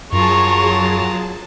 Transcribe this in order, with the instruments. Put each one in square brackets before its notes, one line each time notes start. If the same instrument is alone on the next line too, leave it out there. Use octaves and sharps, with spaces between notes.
[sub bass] F#2 [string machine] F#3 G#4 A5 [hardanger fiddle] F4 A#4 [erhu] C#6